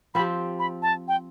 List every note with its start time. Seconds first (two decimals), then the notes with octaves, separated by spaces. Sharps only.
0.15 F3 C4 G4 B5
0.59 B5
0.82 A5
1.08 G5